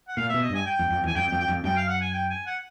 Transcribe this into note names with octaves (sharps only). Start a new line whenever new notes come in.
F#5
A#2 F5
E5
B2
D#5
G2 G#5
G5
F2
F2
E2 G#5
F2 G5
G5
F2
G5
F2
F#2 G5
F5
F#5
G#5
G5
G#5
F#5